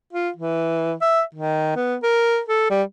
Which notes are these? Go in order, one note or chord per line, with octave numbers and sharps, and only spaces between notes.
F4
E3
E5
D#3
B3
A#4
A4
G3